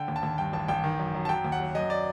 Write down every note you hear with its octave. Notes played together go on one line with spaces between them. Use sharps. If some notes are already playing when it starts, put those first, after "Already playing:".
Already playing: D3 G5
D#2
A5
D#2
G2 G5
A1 A5
A1 G5
D#3
F#2
F#2
A5
F#3 G5
D#2
F#5
F#3
F#2 D#5
D5